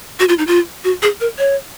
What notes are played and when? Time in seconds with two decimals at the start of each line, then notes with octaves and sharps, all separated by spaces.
0.20 F#4
0.29 F4
0.38 D#4
0.47 F4
0.84 F#4
1.03 G#4
1.21 A#4
1.39 C#5